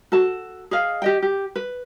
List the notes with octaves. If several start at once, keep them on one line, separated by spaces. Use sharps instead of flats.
F#4 A4 A5
G#4 D#5 F5
G4 D#5 G5
G4
B4